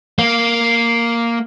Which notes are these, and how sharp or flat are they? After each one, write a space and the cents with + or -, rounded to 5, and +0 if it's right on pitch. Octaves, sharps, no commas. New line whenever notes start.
A#3 +0 F5 +0